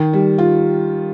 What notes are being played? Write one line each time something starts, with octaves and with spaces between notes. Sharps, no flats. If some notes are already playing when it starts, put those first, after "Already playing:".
Already playing: D#3
G3
F4